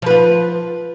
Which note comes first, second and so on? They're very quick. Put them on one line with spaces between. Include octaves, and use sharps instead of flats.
F3 B4 F4